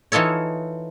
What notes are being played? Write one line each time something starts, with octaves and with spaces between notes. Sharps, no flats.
E3 D#4 F4 A4 C#5